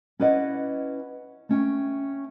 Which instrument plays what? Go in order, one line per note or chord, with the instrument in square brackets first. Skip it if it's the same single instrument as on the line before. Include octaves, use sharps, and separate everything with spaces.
[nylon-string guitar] C#4 E4 B4 D5 D#5 F#5
A3 C#4 G5